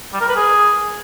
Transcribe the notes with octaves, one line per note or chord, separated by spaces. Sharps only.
G3
A#4
B4
G#4